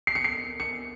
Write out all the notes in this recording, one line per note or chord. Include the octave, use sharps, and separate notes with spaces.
C7
C#7
C7
C#7